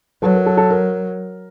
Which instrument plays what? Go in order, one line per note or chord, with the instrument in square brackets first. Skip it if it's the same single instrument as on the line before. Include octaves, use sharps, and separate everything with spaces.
[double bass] F#3 [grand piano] A4 B4
[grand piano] A#4
A4
A4
A#4